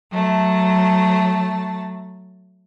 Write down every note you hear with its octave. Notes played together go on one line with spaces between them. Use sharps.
F#3 A3 A5